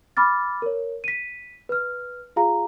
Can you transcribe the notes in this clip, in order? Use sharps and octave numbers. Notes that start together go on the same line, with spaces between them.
B5 D6 F6 A6
A#4 C#5
B6 D#7
B4 F6
F4 G#4 F5 A#5